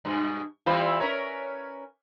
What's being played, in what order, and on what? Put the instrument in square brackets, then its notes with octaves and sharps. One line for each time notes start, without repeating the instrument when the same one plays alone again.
[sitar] G2 B2
[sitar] E3 G3 C4 [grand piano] F4 C5 B5
[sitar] C#4 A#4 B4 [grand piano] C#5